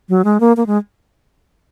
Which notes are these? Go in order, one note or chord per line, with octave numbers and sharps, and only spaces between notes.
F#3
G#3
A#3
A#3
G#3